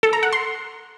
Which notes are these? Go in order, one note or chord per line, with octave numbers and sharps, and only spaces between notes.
A4
A#5
F#5
C6